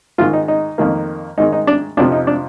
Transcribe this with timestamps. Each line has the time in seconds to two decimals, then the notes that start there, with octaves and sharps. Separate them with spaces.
0.18 G#2 D#3 G#3 F4
0.33 D#4
0.48 D#4
0.78 F2 D#3 A#3
1.38 G#2 D#3 G#3 D#4
1.53 D#4
1.67 D4
1.97 F2 C3 F3 D4
2.12 D#4
2.27 D4